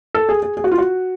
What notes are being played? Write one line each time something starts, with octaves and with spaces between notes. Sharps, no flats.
A4
G#4
G#4
G#4
F#4
F4
F#4